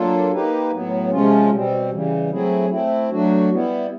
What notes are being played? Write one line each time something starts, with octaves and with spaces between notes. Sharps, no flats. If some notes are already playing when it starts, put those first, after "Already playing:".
Already playing: F#3 A#3 D4 F4 A4
A#3 D#4 G4 B4
A2 F#3 B3
C3 F3 G#3 C#4 F4
B2 G3 C4
C#3 E3 G3
F#3 A3 C4 E4 G#4
A3 C4 E4
F#3 A3 D4 F#4
G3 B3 E4